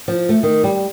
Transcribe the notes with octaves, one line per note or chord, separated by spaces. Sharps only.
F3
A3
D#3
G3